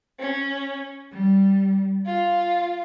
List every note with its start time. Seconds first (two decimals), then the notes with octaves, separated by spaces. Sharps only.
0.18 C#4
1.12 G3
2.05 F4